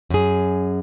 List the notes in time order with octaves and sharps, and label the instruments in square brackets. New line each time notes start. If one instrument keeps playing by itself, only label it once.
[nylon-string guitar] F#2 G#4